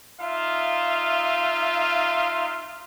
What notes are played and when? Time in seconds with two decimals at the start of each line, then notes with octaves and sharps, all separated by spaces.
0.21 D#4 F4 E5 F5